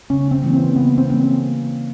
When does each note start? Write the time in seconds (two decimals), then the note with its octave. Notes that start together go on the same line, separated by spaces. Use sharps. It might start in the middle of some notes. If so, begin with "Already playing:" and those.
0.10 C#3 C#4
0.31 C4
0.43 E3 G3 A#3 C#4
0.54 C4
0.76 C#3 B3
0.98 C4
1.10 E3 G3 A#3 C#4